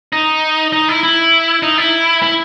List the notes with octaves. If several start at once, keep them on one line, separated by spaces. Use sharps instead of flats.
D#4
D#4
E4
E4
D#4
E4
E4